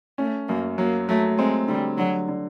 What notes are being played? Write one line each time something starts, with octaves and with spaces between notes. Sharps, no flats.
A3 C#4
F#2 A#3
F#3 A#3
F#3 A3
G#3 C4
D3 G3
D3 F#3
D3